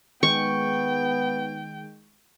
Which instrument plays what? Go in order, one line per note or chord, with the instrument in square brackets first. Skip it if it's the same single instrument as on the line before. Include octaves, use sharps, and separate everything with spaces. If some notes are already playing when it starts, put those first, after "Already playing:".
[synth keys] D#3 G#3 [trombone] B3 [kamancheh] G5 [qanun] C#6